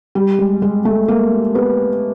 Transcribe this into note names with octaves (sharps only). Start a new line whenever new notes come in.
G3
G#3
G#3
A3
A#3
B3